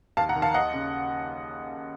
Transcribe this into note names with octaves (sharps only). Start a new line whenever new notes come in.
D#2 F5 A5
F#5 A#5
D#3
F5 A5
D#2 D#5 F#5
C#3